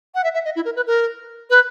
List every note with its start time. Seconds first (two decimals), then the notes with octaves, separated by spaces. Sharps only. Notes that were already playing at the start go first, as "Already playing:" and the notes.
0.15 F#5
0.24 E5
0.34 E5
0.45 D#5
0.56 E4
0.65 A#4
0.76 B4
0.87 A#4
1.50 B4